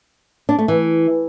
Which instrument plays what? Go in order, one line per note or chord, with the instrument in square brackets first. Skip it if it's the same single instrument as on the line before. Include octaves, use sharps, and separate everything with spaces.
[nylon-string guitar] D4
A3
E3